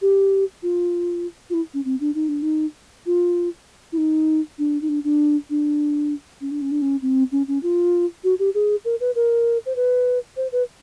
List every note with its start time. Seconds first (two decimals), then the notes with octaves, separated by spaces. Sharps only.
0.02 G4
0.63 F4
1.50 F4
1.54 E4
1.74 C#4
1.85 C4
2.00 D4
2.15 D#4
2.29 D4
2.42 D#4
3.06 F4
3.92 E4
3.98 D#4
4.59 D4
4.82 D#4
4.89 D4
5.04 D4
5.50 D4
6.41 C#4
6.51 D4
6.62 C#4
6.71 D4
6.82 C#4
7.02 C4
7.32 C#4
7.48 C#4
7.63 F4
8.24 F#4
8.39 G4
8.54 G#4
8.85 A#4
9.00 B4
9.15 A#4
9.66 C5
9.76 B4
10.37 C5
10.52 B4